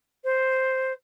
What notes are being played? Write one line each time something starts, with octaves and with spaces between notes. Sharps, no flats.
C5